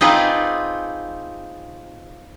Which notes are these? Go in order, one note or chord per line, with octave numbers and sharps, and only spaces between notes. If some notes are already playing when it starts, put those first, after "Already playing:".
C4 D#4 F4 G#4 B4 D5